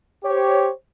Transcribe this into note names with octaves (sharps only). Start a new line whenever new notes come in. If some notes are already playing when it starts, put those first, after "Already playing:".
G4 C5 C#5